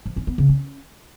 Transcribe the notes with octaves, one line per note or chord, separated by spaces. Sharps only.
F3
C#4
B3
C#3
C#4